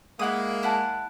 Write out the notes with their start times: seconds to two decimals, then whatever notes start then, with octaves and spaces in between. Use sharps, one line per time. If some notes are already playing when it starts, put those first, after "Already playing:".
0.19 G#3 A#3 E4 F#5 D#6
0.63 E4 F#5 A5